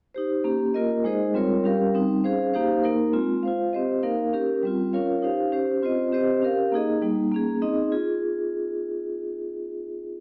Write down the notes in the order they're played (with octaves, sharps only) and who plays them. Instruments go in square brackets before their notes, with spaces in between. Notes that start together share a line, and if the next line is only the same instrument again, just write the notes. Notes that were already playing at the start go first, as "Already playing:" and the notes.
[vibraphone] D#4 G4 C5
A#3 C#4 G4
A#3 F4 A#4 D#5
G#3 D#4 G#4 C5 D#5
G3 C4 F4 A#4 C#5
G3 C#4 G4 A#4 F5
G3 C4 D#4
C#4 G#4 C5 F5
A#3 D#4 G4 C5 F5
A#3 D#4 A#4
G#3 C4 F4
F4 C5 F5
C4 G4 C5 D#5
A#3 D#4 A#4 F5
C#4 G4 A#4
G3 C4 F4
C#4 F4 A#4 C#5 F5
D#4 G4 C5 F5
C#4 G4 C5
C4 F4 C5 D#5
C4 G4 C5 D#5
C#4 G4 A#4 F5
A#3 D#4 G#4 D#5
G3 A#3 D#4
A#3 C#4 G#4
C4 D#4 G#4 D#5
F4 G#4